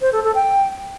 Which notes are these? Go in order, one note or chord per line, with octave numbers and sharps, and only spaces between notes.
C5
A4
A4
G5